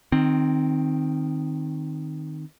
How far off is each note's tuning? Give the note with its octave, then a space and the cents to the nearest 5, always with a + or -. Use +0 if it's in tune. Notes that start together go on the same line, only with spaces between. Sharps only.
D#3 -10 C4 +0